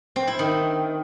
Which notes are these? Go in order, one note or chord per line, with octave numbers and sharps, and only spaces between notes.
C4
E4
D#3